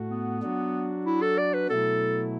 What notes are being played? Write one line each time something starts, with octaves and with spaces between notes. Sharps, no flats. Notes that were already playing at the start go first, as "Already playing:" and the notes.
Already playing: A2 A3 F#4
B3
F#3 D4 F#4
E4
A4
D5
B4
B2 F#3 A3 E4 A4